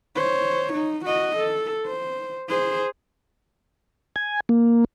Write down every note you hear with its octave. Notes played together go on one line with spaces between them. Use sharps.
C5 C#5
D#4
F#4 D#5
A4
C5
G#4 C5
G#5
A#3